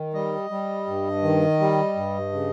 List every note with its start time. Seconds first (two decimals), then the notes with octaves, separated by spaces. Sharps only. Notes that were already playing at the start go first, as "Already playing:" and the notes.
Already playing: D#3
0.14 G3 D#5
0.50 G3
0.87 G2
1.23 D#3
1.60 G3
1.96 G2
2.32 C#3